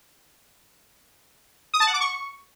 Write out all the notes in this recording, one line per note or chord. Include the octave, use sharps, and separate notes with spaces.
D#6
A5
F#5
D6
C#6